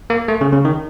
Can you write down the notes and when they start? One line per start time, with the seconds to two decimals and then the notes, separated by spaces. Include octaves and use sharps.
0.10 A#3
0.28 A3
0.41 C#3
0.53 C#3
0.65 D#3